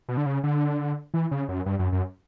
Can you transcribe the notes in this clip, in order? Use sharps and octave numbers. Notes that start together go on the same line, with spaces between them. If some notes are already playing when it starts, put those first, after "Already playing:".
B2
D3
C#3
D3
E3
C#3
F#2
G2
F#2
F#2